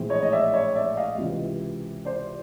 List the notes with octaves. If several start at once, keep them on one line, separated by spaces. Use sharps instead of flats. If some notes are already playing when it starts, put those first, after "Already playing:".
Already playing: A#1 A2 E3 G#3 C4
C#5 D#5
D#5
D5 E5
C#5 D#5
D5 E5
D#5 F5
C#2 C3 E3
C5 D5